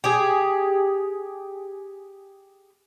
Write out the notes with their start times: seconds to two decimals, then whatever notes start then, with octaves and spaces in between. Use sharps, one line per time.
0.04 G4 G#4